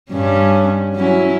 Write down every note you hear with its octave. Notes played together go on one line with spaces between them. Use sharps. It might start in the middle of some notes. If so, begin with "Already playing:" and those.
G2 C#4
F#3 C#4 E4